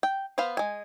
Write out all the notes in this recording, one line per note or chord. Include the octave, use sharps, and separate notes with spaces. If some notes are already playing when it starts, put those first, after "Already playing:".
G5
B3 B4 C5 F5
G#3 G#5